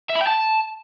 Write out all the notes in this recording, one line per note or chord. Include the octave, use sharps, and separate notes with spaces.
E5
B5
G5
A5